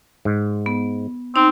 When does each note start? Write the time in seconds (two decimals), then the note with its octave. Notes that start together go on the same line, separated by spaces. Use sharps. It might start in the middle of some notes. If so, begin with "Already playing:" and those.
0.25 G#2
0.66 B3
1.36 C4 D#4